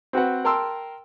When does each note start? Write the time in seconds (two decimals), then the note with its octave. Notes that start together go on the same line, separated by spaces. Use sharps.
0.13 C4 F#4 B4 F#5
0.45 A#4 G5 A5 C6 E6